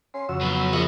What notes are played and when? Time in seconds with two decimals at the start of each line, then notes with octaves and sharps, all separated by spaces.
0.14 C#4 C6
0.29 F2 C#3 F#4 E6
0.41 F#3 B3
0.73 A#1 D#5 F#5